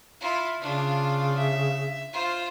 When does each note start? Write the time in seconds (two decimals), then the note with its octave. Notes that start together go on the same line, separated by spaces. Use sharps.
0.20 E4 F4
0.61 C#3 D4 F4
1.37 E5
2.13 F4 C5